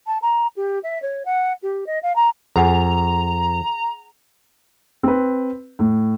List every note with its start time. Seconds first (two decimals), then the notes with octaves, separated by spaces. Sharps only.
0.06 A5
0.22 A#5
0.56 G4
0.83 E5
1.02 C#5
1.25 F#5
1.62 G4
1.86 D#5
2.02 F5
2.15 A#5
2.56 F2 G#4 F#5 G#5 A#5
5.03 C4 B4
5.79 A2